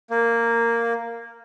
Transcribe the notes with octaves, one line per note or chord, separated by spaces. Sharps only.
A#3